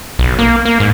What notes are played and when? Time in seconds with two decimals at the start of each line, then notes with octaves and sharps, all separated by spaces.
0.19 B1
0.39 A#3
0.65 A#3
0.80 G#2